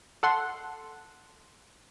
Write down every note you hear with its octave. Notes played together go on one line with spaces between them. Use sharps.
A4 F#5 C6